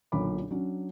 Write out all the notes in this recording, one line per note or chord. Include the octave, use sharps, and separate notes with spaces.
B1 A#2 D3 C#5 B5 D6
D4
F#3 C#4 D4